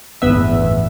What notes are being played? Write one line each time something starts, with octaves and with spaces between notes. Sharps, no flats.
G1 E2 A2 B3 E5